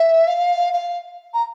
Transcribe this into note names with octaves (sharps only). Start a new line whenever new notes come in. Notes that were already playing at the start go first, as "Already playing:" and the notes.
Already playing: E5
F5
F5
A#5